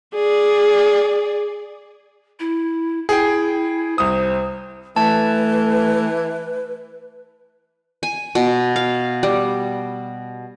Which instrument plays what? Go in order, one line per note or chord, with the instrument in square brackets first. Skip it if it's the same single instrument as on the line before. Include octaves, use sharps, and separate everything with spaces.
[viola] G#4 D5
[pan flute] E4
[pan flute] E4 [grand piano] G#4 G5
[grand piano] C2 D#6 [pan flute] C5
[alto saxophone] E3 [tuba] A3 [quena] B4 [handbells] A5
[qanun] G#5
B2
F5
G3